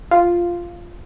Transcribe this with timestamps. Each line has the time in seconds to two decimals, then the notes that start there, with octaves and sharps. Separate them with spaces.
0.11 F4